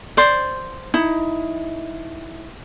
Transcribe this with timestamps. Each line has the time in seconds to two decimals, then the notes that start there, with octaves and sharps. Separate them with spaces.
0.17 C5 D5
0.94 D#4 E4